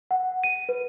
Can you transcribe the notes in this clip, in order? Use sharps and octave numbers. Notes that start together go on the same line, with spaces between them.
F#5
D#7
B4